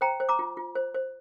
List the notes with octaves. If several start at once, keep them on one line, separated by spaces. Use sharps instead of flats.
C5 G5 A#5
C5
A#5 D6
F4
F4
C5
C5